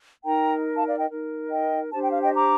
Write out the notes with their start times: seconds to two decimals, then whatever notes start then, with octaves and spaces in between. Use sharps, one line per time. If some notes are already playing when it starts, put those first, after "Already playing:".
0.25 D#4 A#4 G5 A#5
0.77 F5 A5
0.88 D5 F5
0.98 D#5 G5
1.09 D#4 A#4
1.50 D#5 G5
1.92 D4 G4 C5 A5
2.02 G5
2.12 F5
2.23 D#5 G5
2.34 A#5 D6